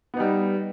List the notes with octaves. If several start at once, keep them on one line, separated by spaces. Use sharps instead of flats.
G3 B3 D#4